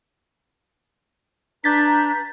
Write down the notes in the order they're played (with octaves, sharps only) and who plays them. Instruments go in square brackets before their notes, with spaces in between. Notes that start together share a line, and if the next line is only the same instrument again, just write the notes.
[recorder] D4 [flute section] B4 A#5 [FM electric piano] G6 A6 B6